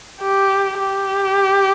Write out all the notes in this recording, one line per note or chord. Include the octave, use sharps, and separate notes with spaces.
G4
G4